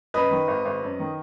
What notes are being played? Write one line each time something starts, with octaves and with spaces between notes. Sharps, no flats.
F#2 B4 D#5
D#3
G#1
G#1
F#2
D#3